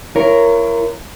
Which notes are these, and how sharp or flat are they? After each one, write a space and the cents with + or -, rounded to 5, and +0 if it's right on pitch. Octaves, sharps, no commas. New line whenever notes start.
E4 +40 A#4 +0 C#5 +0